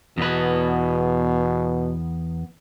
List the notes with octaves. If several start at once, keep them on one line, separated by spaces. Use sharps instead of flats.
E2 B2 B4